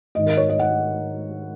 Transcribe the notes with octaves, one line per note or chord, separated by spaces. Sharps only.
G#2 D#3 D#5
A#4
C#5
D#5
F#5